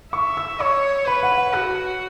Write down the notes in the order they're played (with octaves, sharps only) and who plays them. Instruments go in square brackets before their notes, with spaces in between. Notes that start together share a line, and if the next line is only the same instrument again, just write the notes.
[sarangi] E5 [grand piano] C#6
[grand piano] E6
[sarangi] C#5 [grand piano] C#6
[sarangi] B4 [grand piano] B5
[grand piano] F#5
F#5
[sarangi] F#4 [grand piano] F#6